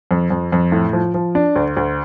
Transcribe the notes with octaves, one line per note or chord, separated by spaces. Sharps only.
F2
F2
F2
A2
F3
F3
D4
D2
D2